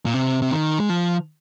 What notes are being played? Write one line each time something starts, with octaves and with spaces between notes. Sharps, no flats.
A#2
C3
C3
D#3
G#3
F3